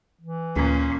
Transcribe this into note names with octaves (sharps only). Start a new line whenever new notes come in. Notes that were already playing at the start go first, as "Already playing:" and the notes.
E3
D2 A#2 C#4